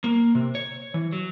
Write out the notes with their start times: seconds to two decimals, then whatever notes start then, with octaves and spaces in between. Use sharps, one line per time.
0.04 A#3
0.35 C3
0.55 C#5
0.94 E3
1.12 F#3